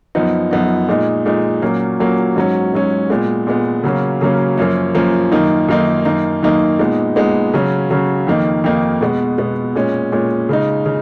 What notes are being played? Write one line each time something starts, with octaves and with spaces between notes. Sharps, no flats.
F#2 F3 B3 D#4
F#2 F3 B3 D#4
A#2 G#3 D#4
A#2 G#3 D#4
A#2 F#3 A#3 C#4
A#2 F#3 A#3 C#4
G#2 F#3 C#4
G#2 F#3 C#4
A#2 G#3 B3
A#2 G#3 B3
C#3 F#3 A#3 C#4
C#3 F#3 A#3 C#4
F#2 F3 A#3 C#4
F#2 F3 A#3 C#4
F#2 D#3 A#3 D#4
F#2 D#3 A#3 D#4
F#2 D#3 A#3 D#4
F#2 D#3 A#3 D#4
A#2 G#3 B3 D#4
A#2 G#3 B3 D#4
C#3 F#3 C#4
C#3 F#3 C#4
F2 D#3 A#3 D#4
F2 D#3 A#3 D#4
B2 G#3 B3
B2 G#3 B3
A#2 G#3 C#4
A#2 G#3 C#4
C#3 G#3 D#4
C#3